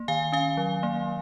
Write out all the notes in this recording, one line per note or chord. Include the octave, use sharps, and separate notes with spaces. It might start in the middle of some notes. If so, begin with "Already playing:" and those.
Already playing: A#3
D#3 F5 G#5
C#4 F5 G#5
F#3
A#3